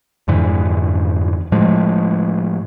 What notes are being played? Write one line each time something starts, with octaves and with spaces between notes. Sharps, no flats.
F2 G#2 D3 E3
A2 F3 G#3 A3